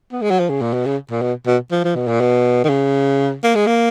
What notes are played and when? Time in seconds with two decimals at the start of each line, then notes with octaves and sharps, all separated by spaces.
0.12 B3
0.21 G#3
0.31 F#3
0.39 F3
0.49 C#3
0.61 A#2
0.73 B2
0.85 C#3
1.10 A#2
1.22 B2
1.46 B2
1.71 F3
1.84 F3
1.95 B2
2.08 A#2
2.20 B2
2.64 D#3
2.69 C#3
3.43 A#3
3.55 G#3
3.67 A#3